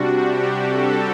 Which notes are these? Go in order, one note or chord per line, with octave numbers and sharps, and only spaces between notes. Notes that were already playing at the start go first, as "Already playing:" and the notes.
Already playing: C3 G3 D4 F#4
G4
A4